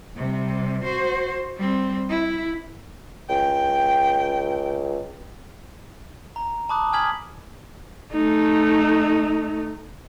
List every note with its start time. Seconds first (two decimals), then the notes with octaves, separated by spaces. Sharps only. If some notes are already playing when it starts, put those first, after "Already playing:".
0.16 C3 G3
0.84 F#4 C5
1.57 G3 C4
2.10 E4
3.29 C#2 G5
6.36 A#5
6.69 A5 B5 D6 D#6 F#6
6.93 G#5 D#6 F6 G#6 B6 F#7
8.12 A3 D#4